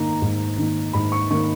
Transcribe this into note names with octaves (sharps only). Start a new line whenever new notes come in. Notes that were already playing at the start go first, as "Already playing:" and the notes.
Already playing: G#2 D#3 A#3 D#4 A#5
G#2
D#3 A#3 D#4
G#2 B5
C#6
D#3 A#3 D#4 C#6